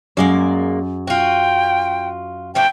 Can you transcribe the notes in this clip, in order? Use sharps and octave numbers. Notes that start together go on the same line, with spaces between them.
F#2 G#3 A#3 G#4 D5
F4 F#4 G5
F3 A3 D4 G5